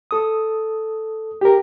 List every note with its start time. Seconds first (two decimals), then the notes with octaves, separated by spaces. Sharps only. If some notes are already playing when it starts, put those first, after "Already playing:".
0.11 A4 D#6
1.41 G4 A#4